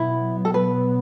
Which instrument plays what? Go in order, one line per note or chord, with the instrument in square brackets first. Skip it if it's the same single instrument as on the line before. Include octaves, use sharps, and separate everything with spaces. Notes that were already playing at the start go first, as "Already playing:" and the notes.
Already playing: [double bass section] B2 F#3 B3 [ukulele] E4
[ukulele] A4
B4